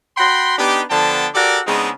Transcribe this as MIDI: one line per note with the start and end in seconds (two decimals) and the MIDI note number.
0.17 0.57 66
0.17 0.57 79
0.17 0.57 83
0.17 0.57 84
0.59 0.82 59
0.59 0.82 62
0.59 0.82 63
0.59 0.82 67
0.91 1.27 50
0.91 1.27 53
0.91 1.27 59
0.91 1.27 62
0.91 1.27 79
0.91 1.27 81
1.35 1.60 66
1.35 1.60 67
1.35 1.60 69
1.35 1.60 70
1.35 1.60 74
1.67 1.91 49
1.67 1.91 56
1.67 1.91 59
1.67 1.91 60
1.67 1.91 62
1.67 1.91 63